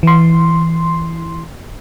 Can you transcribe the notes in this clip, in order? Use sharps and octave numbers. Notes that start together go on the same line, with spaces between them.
E3 C6